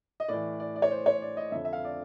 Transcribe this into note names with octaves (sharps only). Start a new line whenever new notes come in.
D#5
A2 E3 D5
D5
D5
C#5
C5
C#5
D5
D#5
F2 D3 E5
E5
F5
D5